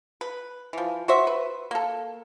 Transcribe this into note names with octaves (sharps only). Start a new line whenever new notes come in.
B4
E3 F3
F#4 C5 E5
B4
A#3 A4